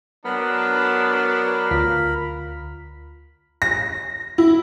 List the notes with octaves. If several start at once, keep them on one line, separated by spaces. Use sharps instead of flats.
F#3 B3 D4 A#4 B5 F6
D2 F4 B6
A#6
E4